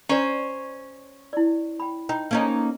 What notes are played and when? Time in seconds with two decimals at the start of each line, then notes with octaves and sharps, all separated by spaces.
0.09 C#4 C5 D5 A#5
1.33 E4 D5
1.80 G5 B5
2.09 D#4 G5
2.31 A#3 C#4 D#4